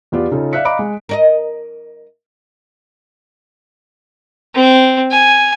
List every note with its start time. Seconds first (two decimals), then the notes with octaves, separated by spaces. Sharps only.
0.12 E2 B3 F4 G4 D5
0.31 C#3 C#4 D#4 F4 A4
0.53 D5 E5 F5 F#6 B6 C#7
0.64 D#5 F5 A#5 B5 D6 D7
0.79 G#3
1.09 A#4 D5 D#5
4.55 C4
5.11 G#5